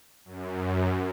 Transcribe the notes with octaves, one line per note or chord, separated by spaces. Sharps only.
F#2